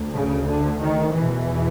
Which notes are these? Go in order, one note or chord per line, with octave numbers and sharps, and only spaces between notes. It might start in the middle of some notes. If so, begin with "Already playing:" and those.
Already playing: D2
C#3
D3
D#3
E2 B2 E3